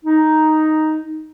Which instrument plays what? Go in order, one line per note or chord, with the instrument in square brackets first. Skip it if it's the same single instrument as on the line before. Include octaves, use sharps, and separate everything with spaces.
[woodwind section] D#4